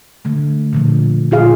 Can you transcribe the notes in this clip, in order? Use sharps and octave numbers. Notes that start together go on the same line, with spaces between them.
D3 A3
A#2 D3 F3
A#2 F4 G#4 F5